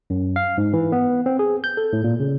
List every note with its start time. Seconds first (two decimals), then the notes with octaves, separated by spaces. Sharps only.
0.10 F#2
0.36 F5
0.58 G#2
0.73 E3
0.92 B3
1.26 C4
1.39 G#4
1.64 G6
1.77 A4
1.93 A2
2.04 A#2
2.20 C#3